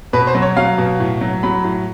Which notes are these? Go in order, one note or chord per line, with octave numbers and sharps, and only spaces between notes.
B2 B4
C5
F#3
C#5
F#3 F5
B2
A2
F#3
F#3 B5
A2